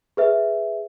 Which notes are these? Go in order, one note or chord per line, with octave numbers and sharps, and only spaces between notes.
G#4 B4 E5